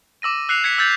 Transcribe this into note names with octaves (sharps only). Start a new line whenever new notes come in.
D6 E6 A#6 D#7
E6 F#6 C7 C#7 F7
G#6 B6 C#7
E6 G6 A6 B6 F7 F#7